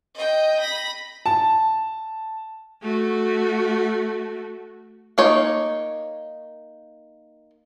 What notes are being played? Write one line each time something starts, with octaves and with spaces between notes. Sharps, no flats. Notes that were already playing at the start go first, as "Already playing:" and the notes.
D#5 G5
B5 A#6
A5
A3 F#4
A#3 D#4 C#5